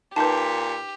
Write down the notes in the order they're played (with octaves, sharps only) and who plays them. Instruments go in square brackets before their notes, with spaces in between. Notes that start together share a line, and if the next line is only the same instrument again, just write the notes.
[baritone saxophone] A#2 [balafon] D#4 B4 [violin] G4 [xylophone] A5 C6 G6